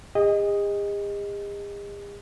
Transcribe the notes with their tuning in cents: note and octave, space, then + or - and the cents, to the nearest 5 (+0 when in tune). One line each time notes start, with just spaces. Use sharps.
G#4 -45 D#5 +0